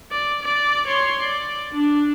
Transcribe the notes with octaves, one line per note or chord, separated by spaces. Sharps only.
D5
D5
C#5 C6
D5
D4